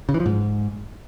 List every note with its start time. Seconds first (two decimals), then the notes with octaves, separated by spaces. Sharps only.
0.09 C#3
0.14 E3
0.20 F3
0.26 G#2